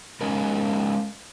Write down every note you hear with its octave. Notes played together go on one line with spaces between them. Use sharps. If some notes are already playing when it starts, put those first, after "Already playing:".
G#3 C#4 D#4 A#4